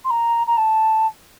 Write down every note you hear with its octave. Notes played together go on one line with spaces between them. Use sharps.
C6
A#5
A#5
A5